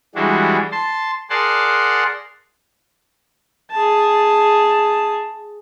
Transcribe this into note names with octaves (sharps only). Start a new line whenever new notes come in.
E3 G3 G#3 D4 F#4
A5 C6
G#4 A#4 D5 F#5 A5 C6
G#4 A5